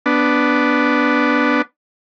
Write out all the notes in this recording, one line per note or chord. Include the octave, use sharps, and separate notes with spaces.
B3 D4